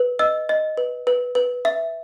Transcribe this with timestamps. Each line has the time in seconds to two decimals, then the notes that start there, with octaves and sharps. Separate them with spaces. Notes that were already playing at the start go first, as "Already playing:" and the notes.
Already playing: B4
0.19 D#5 E6
0.49 D#5
0.77 B4
1.07 B4
1.35 B4
1.65 E5